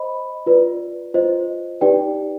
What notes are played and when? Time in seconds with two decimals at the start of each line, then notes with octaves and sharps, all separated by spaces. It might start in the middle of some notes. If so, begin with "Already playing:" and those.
Already playing: C5 D#5 B5
0.46 F4 B4 D5
1.14 F4 C5 D#5
1.81 D#4 G4 B4 D5 G5